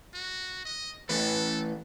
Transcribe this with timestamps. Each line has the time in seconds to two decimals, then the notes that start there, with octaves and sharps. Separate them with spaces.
0.14 F#4
0.65 D#5
1.09 E3 A3 A4 B4